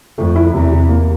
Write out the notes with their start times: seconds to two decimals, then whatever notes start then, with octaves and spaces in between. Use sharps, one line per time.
0.18 F2 A3
0.36 E4
0.54 E2 C3
0.71 C3
0.89 A#3